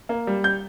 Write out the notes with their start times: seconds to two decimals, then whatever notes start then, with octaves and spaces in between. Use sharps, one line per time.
0.09 A#3
0.27 G3
0.44 G6